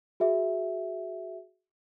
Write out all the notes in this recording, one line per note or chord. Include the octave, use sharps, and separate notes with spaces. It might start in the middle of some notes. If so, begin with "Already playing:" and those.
F#4 G#4 E5